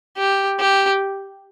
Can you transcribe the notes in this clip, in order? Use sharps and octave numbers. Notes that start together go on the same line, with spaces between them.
G4
G4